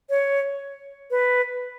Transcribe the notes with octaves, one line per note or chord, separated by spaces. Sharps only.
C#5
B4